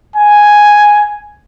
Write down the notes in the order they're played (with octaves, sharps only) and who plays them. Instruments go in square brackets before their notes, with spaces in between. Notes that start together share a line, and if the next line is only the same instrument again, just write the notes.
[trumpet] G#5